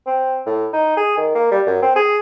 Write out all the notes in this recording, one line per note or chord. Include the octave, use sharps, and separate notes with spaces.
C4
A2
D#4
G#4
D#3
A#3
G3
F#2
C4
G#4